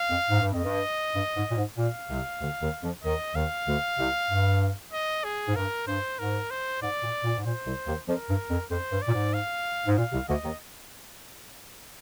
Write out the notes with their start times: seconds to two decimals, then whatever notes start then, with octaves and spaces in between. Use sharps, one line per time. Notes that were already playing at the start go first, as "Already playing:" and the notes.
Already playing: F5
0.10 F2
0.30 G#2
0.41 G2
0.52 F2 D#5
0.64 G2
1.15 G2
1.36 G#2
1.51 A#2
1.57 G#2
1.77 A#2 F5
2.09 C2 C3
2.40 D2 D3
2.62 D#2 D#3
2.83 F2 F3
3.04 D#2 D#3 D#5
3.35 D#2 D#3 F5
3.67 D2 D3
3.98 C2 C3
4.30 G2
4.93 D#5
5.24 G#4
5.48 G#2
5.55 G2 A#4
5.87 G2 C5
6.19 G#2 A#4
6.51 C5
6.82 G#2 D5
7.03 A#2
7.24 A#2
7.37 G#2
7.45 A#2 C5
7.66 C2 C3
7.87 D#2 D#3
8.08 F2 F3 A#4
8.29 G2
8.50 F2
8.71 F2 C5
8.92 G2
9.02 D5
9.08 A#2
9.13 G#2
9.34 F5
9.86 G#2
9.97 A#2 F5
10.12 C2 C3
10.28 D2 D3 D#5
10.44 D#2 D#3